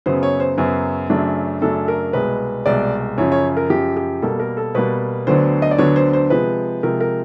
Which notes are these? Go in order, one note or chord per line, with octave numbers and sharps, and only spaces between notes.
F#2 C#3 F#3 B3 C5
C#5
C5
F#2 C#3 F#3 B3
F#2 C#3 F#3 A3 D4
F#2 C#3 F#3 A3 D4 A4
A#4
C2 B2 G#3 B4
C2 B2 G#3 D5
F#2 C#3 F3 C#5
C#5
A#4
F#2 C#3 F3 G4
G4
B2 G3 A#3 A4
A#4
A4
B2 G3 A#3 B4
D2 D3 F#3 B3 D4 C5
D#5
D5
D2 D3 F#3 B3 D4 C#5
C5
C5
C3 F3 G#3 B4
C3 F3 G#3 A#4
A#4